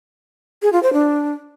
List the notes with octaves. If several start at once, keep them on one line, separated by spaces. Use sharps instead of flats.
G#4
F4
C5
D4